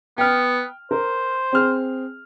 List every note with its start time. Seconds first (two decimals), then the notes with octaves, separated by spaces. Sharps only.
0.18 B3 G5 F6
0.91 A#4 C5
1.52 C4 G#4 F6